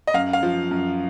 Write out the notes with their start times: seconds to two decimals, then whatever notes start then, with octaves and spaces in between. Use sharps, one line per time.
0.07 D#5
0.14 F#2 F5
0.33 F5
0.43 F3
0.71 F#2